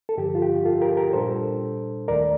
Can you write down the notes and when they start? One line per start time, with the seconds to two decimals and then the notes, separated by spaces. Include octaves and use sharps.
0.09 A4
0.17 G2 D3 F3 G4
0.35 F4
0.42 G4
0.65 F4 A4
0.81 G4 A#4
0.97 G4 A#4
1.13 A#2 G3 D4 A4 C5
2.08 D#2 D#3 A3 A#4 D5